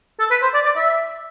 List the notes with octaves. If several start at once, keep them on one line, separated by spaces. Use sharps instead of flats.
A4
B4
C5
D5
D5
E5